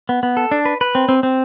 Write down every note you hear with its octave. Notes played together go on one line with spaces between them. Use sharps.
B3
B3
A4
D4
B4
B4
C4
C4
C4